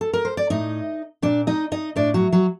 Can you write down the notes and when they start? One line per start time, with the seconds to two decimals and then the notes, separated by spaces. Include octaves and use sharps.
0.01 A4
0.13 A#4
0.25 C5
0.37 D5
0.50 A2 D#4 D#5
1.22 A#2 D4 D5
1.47 D#4 D#5
1.72 D#4 D#5
1.96 A2 D4 D5
2.14 F#3 F#4
2.32 F#3 F#4